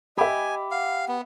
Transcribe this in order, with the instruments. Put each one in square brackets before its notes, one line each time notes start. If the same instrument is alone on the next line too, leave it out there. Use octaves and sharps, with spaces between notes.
[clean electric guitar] G4 [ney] D#5 [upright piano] E5 B5 [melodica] G#5
[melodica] F5 [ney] F#5
[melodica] B3